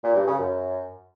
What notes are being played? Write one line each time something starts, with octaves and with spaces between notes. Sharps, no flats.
A#2
G2
C#3
F#2